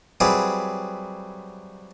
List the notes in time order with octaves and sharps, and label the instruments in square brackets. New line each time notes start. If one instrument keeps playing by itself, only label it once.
[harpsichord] F#3 G3 C4 E4 G#4 B4